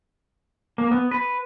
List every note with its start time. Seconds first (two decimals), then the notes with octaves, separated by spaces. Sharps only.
0.78 A#3
0.91 B3
1.11 B4